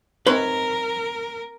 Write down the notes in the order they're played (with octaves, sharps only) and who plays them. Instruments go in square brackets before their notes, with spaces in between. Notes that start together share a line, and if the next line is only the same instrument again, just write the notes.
[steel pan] C4 D#4 C#5 [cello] A#4 [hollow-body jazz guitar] B4 C6